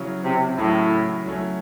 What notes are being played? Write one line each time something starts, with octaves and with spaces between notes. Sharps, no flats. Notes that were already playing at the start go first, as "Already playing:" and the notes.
Already playing: C#3 F#3 C#4 E4
C3
A2 C#3 F#3 C#4 E4
F#3 A3 C#4 E4